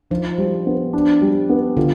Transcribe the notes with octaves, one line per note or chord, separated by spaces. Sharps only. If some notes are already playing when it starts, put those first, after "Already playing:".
F3 D#4
G3
B3
D4
G3
B3
D3 F4